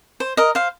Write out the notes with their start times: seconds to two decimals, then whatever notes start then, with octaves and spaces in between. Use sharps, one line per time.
0.20 C5
0.37 A#4 D#5
0.55 C5 F5